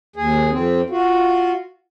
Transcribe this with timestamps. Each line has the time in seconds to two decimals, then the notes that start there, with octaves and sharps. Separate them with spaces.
0.16 D#2 G#4
0.50 F2 C4
0.90 F4 F#4